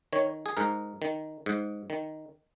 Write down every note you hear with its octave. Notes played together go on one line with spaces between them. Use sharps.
D#3 C#5
G#4
G#2 A#4
D#3
G#2
D#3